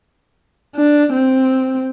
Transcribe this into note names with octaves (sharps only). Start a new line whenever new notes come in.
D4
C4